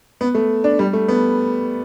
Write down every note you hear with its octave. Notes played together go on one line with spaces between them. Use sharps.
B3
A3
D4
G3
A3
B3